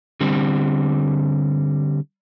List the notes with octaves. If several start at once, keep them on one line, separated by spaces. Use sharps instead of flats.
D3 G3 C4